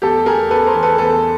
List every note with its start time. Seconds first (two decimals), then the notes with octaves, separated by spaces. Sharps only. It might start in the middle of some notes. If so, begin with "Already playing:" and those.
0.02 E2 G4 A4
0.26 E2 G#4 A#4
0.50 C#3 A4 B4
0.66 A#4 C5
0.74 E3
0.83 A4 B4
0.98 E2 A4 B4